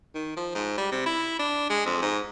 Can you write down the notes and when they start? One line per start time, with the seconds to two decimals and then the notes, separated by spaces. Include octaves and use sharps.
0.15 D#3
0.36 F3
0.55 G#2
0.78 G3
0.92 C3
1.06 E4
1.39 D4
1.70 G#3
1.86 F2
2.02 G#2